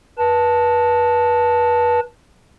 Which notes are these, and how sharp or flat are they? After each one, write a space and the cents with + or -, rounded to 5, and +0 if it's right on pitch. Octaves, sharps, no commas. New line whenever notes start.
B4 -30 A5 +0